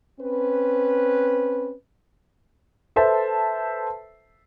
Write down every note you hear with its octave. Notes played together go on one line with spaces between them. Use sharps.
C4 C#4 B4
A4 B4 C5 E5 A5